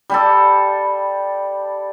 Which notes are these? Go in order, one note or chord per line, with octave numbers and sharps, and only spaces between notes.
G3 G4 A4